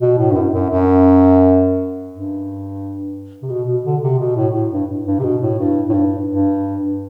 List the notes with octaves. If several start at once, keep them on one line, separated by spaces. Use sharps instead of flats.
B2
A2
G2
F#2
F#2
F#2
G2
C3
B2
B2
D3
C3
B2
A2
A2
G2
G2
C3
B2
A2
G2
A2
G2
G2